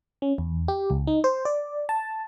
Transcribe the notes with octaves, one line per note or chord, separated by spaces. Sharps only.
C#4
E2
G4
C#2
D#4
C5
D5
A5